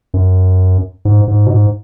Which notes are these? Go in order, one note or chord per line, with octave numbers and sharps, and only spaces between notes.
F#2
G#2
G#2
B2
G#2